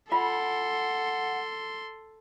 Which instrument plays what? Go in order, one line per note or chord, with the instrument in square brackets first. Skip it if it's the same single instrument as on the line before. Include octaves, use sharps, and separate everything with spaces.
[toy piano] F4 B5 [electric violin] A4 C6 [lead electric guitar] E5 F#5